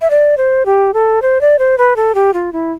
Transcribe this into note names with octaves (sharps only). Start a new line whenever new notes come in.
E5
D5
C5
G4
A4
C5
D5
C5
B4
A4
G4
F4
E4